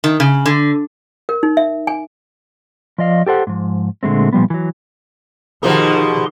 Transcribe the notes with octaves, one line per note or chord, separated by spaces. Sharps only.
D#3
C#3
D3
A#4
D#4
E5
G#5
F3 D5 D#5 F5
G4 A4 C5 F#5
G#2 F3
A#2 D3 G#3 A3 C4
A#2 F3 G3 B3
E3 F#3
B2 D#3 F3 G4 G#4 A#4 C6